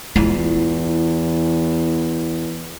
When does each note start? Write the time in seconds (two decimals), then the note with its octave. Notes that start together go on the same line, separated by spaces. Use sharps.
0.16 E2 E4 F4